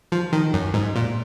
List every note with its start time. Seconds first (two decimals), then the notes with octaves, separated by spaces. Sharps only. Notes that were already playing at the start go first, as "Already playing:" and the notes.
0.12 F3
0.33 D#3
0.54 F#2
0.74 G#2
0.96 A#2